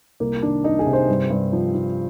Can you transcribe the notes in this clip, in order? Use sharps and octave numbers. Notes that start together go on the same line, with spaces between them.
C2 A#3
D#3 D4
C2 D#4
G#4
C3
C5
G2
G2
F3
F3